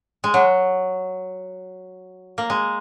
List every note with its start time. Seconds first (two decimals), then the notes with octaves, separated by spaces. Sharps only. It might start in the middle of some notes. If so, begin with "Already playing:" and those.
0.24 G#3
0.34 F#3
2.38 A#3
2.50 G#3